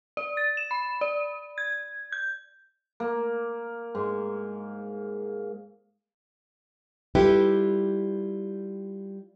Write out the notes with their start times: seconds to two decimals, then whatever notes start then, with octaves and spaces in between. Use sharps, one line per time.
0.17 D5
0.37 A6
0.57 E7
0.71 B5
1.01 D5
1.58 G#6
2.12 G6
3.00 A#3
3.95 G#2
7.15 G3 E4 F4 G4 A4 B4